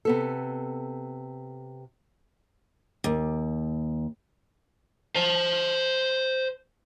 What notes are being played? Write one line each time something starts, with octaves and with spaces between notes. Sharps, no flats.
C3 B3 A4
D#2
C5 A5